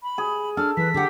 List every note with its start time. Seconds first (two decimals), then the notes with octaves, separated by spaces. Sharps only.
0.03 B5
0.18 G#4
0.57 D4 A4 F6
0.77 E3 B4 B6
0.94 D3 G4 F#5